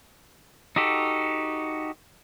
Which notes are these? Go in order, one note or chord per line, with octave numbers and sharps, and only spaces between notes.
D#4 F#4 G4 A4